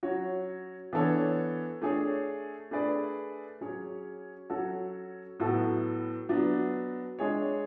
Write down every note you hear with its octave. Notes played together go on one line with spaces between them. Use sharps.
F#3 C#4 F#4 C#5
E3 B3 D4 A4 C#5
A3 D4 G#4 C#5
A3 D4 G#4 B4 D5
F#3 C#4 G#4 C#5
F#3 C#4 F#4 A4 C#5
A2 F#3 B3 F#4 A4
F#3 B3 D4 F#4
G#3 D4 G#4 C#5